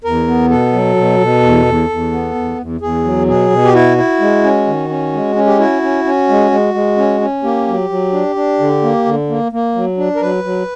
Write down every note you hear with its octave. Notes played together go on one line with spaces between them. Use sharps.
E2 A#4
B3
B2 A4
F#3
B2
B2
E2
E2
E2
B3
E2
E2
E2 G#4
F#3
B2 G#4
B2
G4
E4 F#4
E4
G#3
C#4
D#3
C#4
G#3
C#4
G4
E4 F#4
C#4
C#4
G#3
G#3
G#3
C#4
C#4
A#3 G4
F#3
F#3
D4
D4
D3
A#3
D3
A#3
A#3
F#3
D4
A#4
F#3 B4
F#3